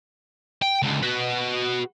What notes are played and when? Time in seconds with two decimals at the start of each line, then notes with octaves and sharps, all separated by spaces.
0.62 G5
0.82 C#2 D3
1.03 F#4 B4